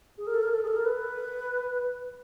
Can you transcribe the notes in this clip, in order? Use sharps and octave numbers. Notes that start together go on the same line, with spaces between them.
G#4
A#4
A4
A#4
A4
G#4
A4
A#4
B4